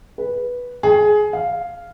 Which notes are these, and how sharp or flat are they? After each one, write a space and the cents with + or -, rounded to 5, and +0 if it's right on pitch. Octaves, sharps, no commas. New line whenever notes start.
B4 -10
G#4 +20
F5 -5